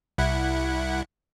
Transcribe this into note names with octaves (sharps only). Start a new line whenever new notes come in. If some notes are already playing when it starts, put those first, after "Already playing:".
C2 E4 F#5